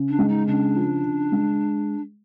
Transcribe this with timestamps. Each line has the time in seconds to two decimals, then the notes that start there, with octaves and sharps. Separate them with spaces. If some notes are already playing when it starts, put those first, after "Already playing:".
Already playing: C#3
0.09 D4
0.19 G#3
0.29 D#4
0.47 C#3 D4
0.76 F3
1.04 C#3
1.32 G#3